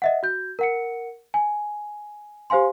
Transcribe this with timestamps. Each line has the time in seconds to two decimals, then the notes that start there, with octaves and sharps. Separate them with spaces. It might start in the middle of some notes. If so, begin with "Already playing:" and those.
0.02 D#5 E5 F#5
0.23 F#4 G6
0.59 A#4 F#5 C#7
1.34 G#5
2.50 G4 C5 F5 G#5 C6